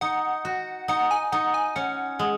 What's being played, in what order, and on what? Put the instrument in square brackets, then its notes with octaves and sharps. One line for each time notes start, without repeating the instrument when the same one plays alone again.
[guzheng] D#4 [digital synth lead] F#5
[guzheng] F#4
[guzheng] D#4 [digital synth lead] F#5
[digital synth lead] G#5
[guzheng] D#4 [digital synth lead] F#5
[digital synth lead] G#5
[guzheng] C#4 [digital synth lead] F#5
[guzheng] G#3